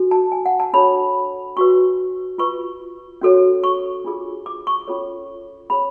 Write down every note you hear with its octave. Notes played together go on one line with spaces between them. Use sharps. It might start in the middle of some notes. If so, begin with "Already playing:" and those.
Already playing: D4 F#4 A4
A5
G#5
F#5
A5
D4 F#4 A4 C#5 B5
D4 F#4 B4 C#6
F4 B4 C#6
C#4 F#4 A4 C#5
C#6
D4 F4 G#4
D6
C#6
C#4 F4 A4 C#5
C#4 G#4 C#5 B5